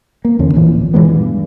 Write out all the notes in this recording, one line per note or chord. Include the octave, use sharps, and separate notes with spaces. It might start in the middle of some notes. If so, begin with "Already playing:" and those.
A#3
E2 D3 C#4
D1 A#1 E3 F3
A#2 E3 G#3 B3
G2